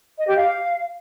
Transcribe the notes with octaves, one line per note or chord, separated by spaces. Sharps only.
D#5
G4
F5